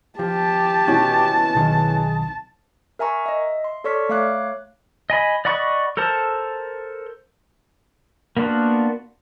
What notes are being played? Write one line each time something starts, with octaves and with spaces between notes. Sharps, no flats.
F3 G4 A5
B2 E3 C#4 F#4
B1 D#3 G#4
A#4 E5 G#5 A#5 C#6
D#5 E5
C6
A4 C#5 D5 C#6 F6 B6
A3 C#5 F5 D6 F#6
D#5 G#5 B5
D5 D#5 F#5 B5 C#6
A4 A#4 C5 A5
A#3 B3 D4 F4 F#4